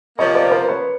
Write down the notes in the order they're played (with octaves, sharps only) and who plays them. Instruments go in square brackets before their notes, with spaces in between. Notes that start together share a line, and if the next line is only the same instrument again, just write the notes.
[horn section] C3 F3 A#3 [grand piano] C#5 D#5
[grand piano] C5 D5
A#4 C5
B4 C#5